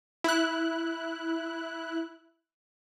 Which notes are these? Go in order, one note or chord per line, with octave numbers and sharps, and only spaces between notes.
E4 F#6